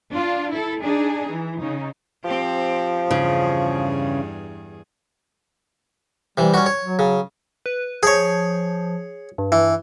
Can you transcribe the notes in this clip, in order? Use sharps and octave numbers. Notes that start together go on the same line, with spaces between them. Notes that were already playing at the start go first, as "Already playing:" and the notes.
D4 F4
E4 A4
D4 D#4 G#4
E3
C#3 D#4
F3 C4 G4
E2 G2 C#3 G#4
C3 E3 G3
C#4 F#4
C#5
F#3
C#3
B4
F3 G#4 C#5
G2
E3